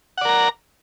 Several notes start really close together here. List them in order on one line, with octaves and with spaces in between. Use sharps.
F#5 D5 A#4 A#5